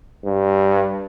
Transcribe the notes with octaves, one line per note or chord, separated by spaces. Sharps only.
G2